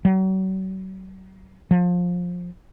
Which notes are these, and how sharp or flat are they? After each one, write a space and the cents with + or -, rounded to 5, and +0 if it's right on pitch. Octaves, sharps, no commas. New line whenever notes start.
F#3 +40
F3 +20